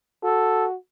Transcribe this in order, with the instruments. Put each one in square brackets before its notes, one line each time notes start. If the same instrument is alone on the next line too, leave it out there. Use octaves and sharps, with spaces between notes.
[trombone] F#4 [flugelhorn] A4